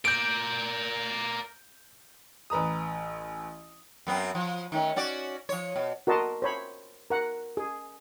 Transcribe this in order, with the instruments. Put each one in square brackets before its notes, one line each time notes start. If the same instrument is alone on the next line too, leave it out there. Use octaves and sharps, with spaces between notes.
[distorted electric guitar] A#4 D5 [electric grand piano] G6 D7
[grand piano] A1 B4 A#5 D#6
[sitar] F#2 B3 C4
F3
D#3 A3 C#4
C#4 F#4 D5
F3 C#5
B2
[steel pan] F#4 A#4 D#5 A5 C6
C5 C#5 B5
A#4 F#5
G#4